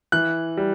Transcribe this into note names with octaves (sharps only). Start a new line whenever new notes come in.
E3 F#6
G3